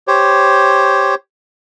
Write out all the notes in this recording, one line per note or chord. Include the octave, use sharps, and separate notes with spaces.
G4 C5 C#5